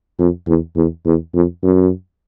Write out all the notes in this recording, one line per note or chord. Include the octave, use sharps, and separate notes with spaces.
F2
E2
E2
E2
F2
F#2